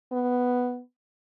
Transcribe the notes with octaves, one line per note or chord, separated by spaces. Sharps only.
B3